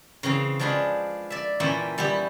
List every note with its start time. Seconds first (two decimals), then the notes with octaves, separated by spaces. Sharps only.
0.23 C#3 E3 C4 A#5
0.60 F3 G#3 D4 G#4 B4
1.30 D5 E5
1.60 A#2 E3 C#4 E5 G5 B5
1.98 G3 B3 E4 G4